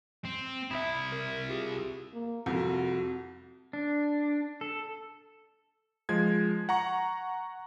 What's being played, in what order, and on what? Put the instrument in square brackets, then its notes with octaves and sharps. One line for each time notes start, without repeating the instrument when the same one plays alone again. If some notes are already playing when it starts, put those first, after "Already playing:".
[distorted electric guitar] C4
[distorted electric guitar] C2 E4 [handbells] E5 B5 D#6
[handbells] A#4
F4 G4 G#4
[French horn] A#3
[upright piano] C2 F2 [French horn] F#4
[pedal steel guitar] D4
A4
[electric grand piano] F3 G#3 G#6
F#5 A#5 C#6